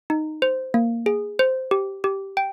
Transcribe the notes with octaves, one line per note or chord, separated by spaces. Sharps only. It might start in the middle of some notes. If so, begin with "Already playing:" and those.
D#4
C5
A#3
G#4
C5
G4
G4
G5